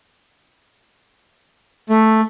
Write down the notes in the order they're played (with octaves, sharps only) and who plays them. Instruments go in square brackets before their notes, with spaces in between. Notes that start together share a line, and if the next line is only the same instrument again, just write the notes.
[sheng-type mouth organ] A3